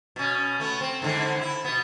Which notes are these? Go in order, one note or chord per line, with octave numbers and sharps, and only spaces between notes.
B2 C#4
A3 B3
C4
G#2 D3 E3
E4
B2 B3